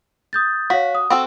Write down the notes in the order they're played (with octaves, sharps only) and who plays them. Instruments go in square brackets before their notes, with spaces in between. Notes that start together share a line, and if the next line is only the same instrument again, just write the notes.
[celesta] D#6 G6 A6
[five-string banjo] F#4 [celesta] C#5 F5 B6
[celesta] D#6
[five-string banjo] C4 F#4 A4 [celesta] E6